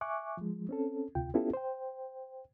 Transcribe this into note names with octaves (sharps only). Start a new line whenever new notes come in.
E5 G#5 C#6 D6 F#6
F3 G#3
C4 C#4 A4
D2 C3 F4 G5
B3 C#4 E4 F4 G4 A4
C5 G5